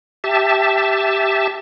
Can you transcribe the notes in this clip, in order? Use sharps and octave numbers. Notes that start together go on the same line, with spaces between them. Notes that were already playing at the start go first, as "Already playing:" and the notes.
G4 E5 A5